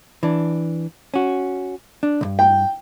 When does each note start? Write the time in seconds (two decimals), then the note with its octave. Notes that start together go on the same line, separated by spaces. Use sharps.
0.23 E3 D4
1.14 C#4 F#4
2.03 D4
2.21 C2 G2
2.39 G5